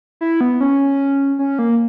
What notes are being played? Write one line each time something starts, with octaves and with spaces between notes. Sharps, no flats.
E4
B3
C#4
C#4
A#3